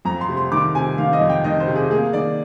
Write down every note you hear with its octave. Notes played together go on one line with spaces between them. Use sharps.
F2 A#5
C6
C3
C6
D#3 D6
C3 G#5
D#3 F5
D#5
F2
G5
D#3 D#5
C5
C3
G#4
A#3 G#4
D#3 D5